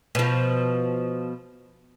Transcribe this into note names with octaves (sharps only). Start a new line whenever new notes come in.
B2 F3